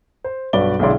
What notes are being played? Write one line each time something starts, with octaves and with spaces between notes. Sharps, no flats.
C5
B1 G2 F#4 B4 D5 G7
B1 D3 G#3 E4 D5 C6